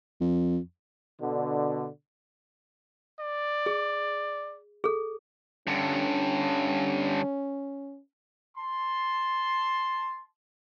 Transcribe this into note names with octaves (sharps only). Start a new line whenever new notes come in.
F2
B2 D3
D5
G#4
G#4 A4
G2 D3 C#4
A5 C6